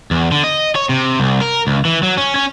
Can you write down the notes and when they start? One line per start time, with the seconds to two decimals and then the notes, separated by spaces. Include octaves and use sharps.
0.11 E2
0.32 D3
0.44 D#5
0.75 C#5
0.89 C3
1.20 C2
1.41 A#4
1.67 C#2
1.85 E3
2.03 F#3
2.17 C#4
2.35 C#4